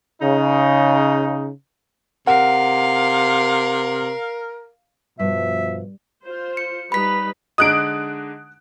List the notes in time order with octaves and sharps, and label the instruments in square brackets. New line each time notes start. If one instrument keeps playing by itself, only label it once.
[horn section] C#3 D#4
[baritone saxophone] C3 [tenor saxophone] A#4 [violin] F5 [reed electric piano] F#5
[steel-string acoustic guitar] G2 [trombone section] B2 F3 [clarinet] E5
[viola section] F4 C5
[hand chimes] C#7
[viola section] G3 D#4 B4 [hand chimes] B5 B6
[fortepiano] D3 G#3 D#4 [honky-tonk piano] D#6 F#6 D7